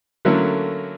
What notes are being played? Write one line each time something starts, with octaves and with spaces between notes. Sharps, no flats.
D3 F#3 A3 A#3 C#4 E4